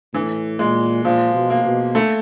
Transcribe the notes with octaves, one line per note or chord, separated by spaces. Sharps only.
A2 E3
A#2 G#3
A#2 F3
B2
A#3
B2
A3